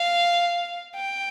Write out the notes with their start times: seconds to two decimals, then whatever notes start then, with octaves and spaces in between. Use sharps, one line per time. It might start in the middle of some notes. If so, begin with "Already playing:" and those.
Already playing: F5
0.95 G5